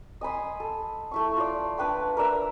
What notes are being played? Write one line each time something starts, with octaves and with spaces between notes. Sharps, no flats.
D#5 G#5 B5 C6
A4
A3 E4 C#6
F4 C#5 D5
D4 B4 G5 B5
A#4 D5 E5 B5